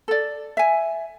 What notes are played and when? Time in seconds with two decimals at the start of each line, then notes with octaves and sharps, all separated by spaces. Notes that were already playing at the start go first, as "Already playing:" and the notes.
0.08 A4 D5
0.57 E5 G#5